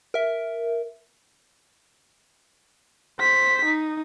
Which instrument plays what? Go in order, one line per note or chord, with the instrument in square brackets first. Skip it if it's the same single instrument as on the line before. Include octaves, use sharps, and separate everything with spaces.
[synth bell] A#4 E5
[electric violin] C5 B6
D#4